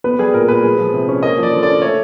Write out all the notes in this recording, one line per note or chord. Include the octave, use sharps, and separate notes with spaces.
B3 B4
G3 G#4
A#2 A#4
A#2 B4
G#3
F3
C3
C#4
A#3 D#5
F3 D5
D3
C#4 D5
A3 C#5